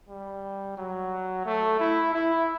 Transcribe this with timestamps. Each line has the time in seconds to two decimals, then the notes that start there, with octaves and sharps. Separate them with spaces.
0.09 G3
0.77 F#3
1.46 A3
1.80 E4
2.13 E4